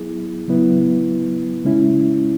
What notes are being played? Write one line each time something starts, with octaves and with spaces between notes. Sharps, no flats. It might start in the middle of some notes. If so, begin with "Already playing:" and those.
Already playing: F#3 B3 E4 G#4
C#3 F#3 B3 E4 B4
C#3 G#3 C#4 E4